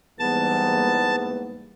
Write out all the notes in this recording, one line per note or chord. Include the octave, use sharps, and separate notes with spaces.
E2 G#2 E3 G3 A#3 B3 A5